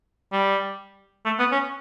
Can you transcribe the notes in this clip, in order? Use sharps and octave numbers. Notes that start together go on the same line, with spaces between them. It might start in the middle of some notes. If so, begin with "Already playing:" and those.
G3
A3
B3
C#4